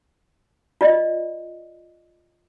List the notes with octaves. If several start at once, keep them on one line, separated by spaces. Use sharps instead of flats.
F4 D5 D#5